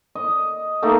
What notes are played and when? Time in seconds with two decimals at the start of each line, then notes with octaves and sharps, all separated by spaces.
0.15 D#5
0.82 A3 A#3 D#4 A#4